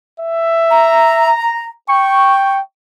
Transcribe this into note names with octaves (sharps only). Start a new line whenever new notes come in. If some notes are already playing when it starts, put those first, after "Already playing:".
E5
A#5
G5 C#6